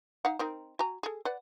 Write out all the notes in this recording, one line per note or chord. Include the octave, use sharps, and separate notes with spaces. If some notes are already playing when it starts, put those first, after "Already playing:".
D#4 F5 F#5
C4 D#4 A#4
F#4 G#5 A#5
G#4 A4
B4 D5 F#5